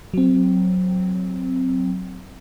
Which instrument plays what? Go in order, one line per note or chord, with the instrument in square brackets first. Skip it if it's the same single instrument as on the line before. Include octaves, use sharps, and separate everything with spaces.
[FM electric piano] F#3 C4